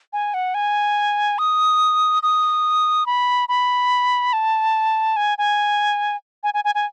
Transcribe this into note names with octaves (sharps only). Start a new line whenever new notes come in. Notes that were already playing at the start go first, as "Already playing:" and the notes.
G#5
F#5
G#5
D#6
D#6
B5
B5
A5
G#5
G#5
G#5
G#5
G#5
G#5